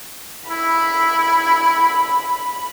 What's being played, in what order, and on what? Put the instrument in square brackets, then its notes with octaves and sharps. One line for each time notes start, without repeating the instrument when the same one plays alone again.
[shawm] E4 [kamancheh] B5